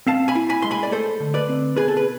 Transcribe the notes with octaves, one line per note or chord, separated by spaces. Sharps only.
C4 F5 A5
G#5 B5
E4
G#5 B5
G#3 C6
G#5 B5
D5
A3 A4 C5
D3
B4 D5
C4
B2 G#4 B4
A4
B4